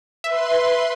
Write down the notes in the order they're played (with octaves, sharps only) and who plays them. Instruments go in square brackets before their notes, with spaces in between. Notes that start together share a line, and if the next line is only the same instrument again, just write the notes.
[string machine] B4 C6 [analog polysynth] E5